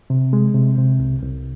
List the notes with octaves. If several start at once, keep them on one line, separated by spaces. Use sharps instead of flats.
C3
G#3
C3
C3
C2
C2